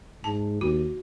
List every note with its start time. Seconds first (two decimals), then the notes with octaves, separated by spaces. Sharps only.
0.24 G#2 A5
0.61 D#2 F#4